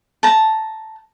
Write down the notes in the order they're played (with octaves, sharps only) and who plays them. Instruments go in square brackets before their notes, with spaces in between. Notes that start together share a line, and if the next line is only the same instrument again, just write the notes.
[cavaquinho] A5 A#5